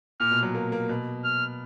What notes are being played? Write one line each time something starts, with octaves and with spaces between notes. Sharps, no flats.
A#2 F6
B2
F#3
A#3
A#3
B2
F6